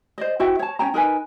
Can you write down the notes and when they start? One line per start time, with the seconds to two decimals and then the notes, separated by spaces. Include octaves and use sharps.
0.18 C5 D5 D#5
0.39 E4 F#4 E5 G5
0.59 C#5 A5
0.79 C#4 C#5 G5 A#5
0.94 D#4 A#4 B4 G#5